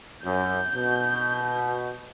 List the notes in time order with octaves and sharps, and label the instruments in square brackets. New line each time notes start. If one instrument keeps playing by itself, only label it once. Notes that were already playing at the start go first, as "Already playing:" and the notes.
[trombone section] F#2 [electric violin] G6
[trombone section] B2